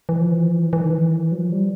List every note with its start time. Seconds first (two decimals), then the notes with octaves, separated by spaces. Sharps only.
0.09 E3
0.21 F3
0.31 E3
0.42 F3
0.54 E3
0.73 E3
0.81 D#3
0.91 E3
1.32 F#3
1.37 F3
1.52 G3